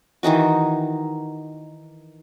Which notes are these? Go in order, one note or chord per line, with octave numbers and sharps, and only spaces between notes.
D#3 E3 D#4 F#4